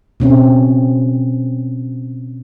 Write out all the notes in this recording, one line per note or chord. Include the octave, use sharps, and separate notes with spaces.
B2 C4 C#4